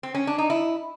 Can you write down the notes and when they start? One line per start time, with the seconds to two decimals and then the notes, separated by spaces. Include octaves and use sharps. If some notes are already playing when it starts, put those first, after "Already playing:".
0.03 C4
0.15 C#4
0.27 D4
0.38 D#4
0.50 E4